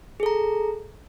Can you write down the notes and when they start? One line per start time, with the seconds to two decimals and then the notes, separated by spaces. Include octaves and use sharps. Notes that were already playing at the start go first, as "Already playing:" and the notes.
0.20 G#4
0.23 A4
0.26 A#5